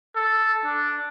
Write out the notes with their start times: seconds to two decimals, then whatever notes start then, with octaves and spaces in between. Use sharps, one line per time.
0.16 A4
0.65 D4